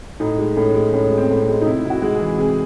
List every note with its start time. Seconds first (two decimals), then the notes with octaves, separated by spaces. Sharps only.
0.20 A2 D#4
0.38 G#3
0.56 A2 C#4
0.74 G#3
0.93 A2 C#4
1.11 G#3
1.17 C4
1.30 A2
1.41 C4
1.48 G#3
1.61 D#4
1.66 C3 E4
1.84 C3 E4
1.90 F#4
2.02 G#3
2.15 G#4
2.20 E3
2.38 C3 G#4